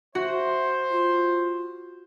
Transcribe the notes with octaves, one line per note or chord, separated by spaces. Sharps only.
F#4 C5 E5
F4